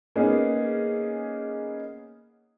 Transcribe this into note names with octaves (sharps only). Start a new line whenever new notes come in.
A#3 B3 C#4 D#4 G#4